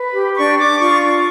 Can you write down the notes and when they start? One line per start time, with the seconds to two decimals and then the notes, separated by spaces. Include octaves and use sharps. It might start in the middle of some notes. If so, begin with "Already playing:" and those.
Already playing: B4
0.14 G4
0.37 D4 C#6
0.58 D4 D6
0.79 F4 C#6
1.02 D4 C#6